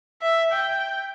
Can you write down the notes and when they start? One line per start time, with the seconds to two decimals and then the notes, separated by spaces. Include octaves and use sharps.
0.22 E5
0.52 G5